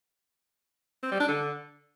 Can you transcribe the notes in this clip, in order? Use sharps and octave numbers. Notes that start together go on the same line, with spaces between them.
C4
G3
D4
D3